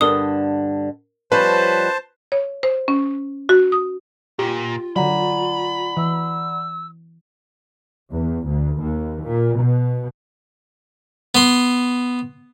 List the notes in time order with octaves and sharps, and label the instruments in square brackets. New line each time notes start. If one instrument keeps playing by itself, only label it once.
[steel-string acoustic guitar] G2 D3 [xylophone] A#4 D#6
[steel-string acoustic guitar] F3 G3 C#4 [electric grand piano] B4 [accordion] C5 A5
[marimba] C#5
C5
C#4
F#4
D#6
[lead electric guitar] A#2 [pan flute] F4 [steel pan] G4
[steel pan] D3 F#3 [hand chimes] D5 F#5 A#5 [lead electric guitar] B5
[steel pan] E3 [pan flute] E6
[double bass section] E2
D2
D#2
A#2
B2
[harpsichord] B3 C6